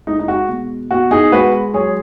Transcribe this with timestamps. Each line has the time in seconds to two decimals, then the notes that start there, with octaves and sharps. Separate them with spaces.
0.07 G#3 D#4
0.19 D#4
0.28 F#4
0.49 B2
0.91 B2 F#4
1.11 D#4 G#4
1.32 G#3 F#4 B4
1.74 F#3 G#4 C#5